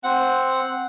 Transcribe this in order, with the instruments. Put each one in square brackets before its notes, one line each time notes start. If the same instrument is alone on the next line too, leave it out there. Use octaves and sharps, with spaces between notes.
[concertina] C4 [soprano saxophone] F#5